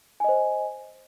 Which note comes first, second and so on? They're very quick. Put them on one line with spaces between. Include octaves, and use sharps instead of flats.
G#5 D#5 C5